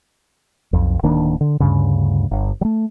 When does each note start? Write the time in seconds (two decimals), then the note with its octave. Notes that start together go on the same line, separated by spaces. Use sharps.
0.73 B1 F2
1.03 D1 D#3 A#3 D4
1.41 D3
1.60 D2 G2 C#3
2.31 G1
2.61 F#3 A3